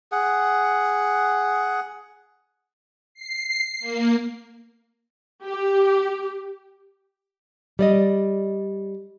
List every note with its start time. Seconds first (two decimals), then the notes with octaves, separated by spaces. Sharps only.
0.12 G#4 F#5
3.14 C7
3.80 A#3
5.47 G4
7.79 G3 D5 D#5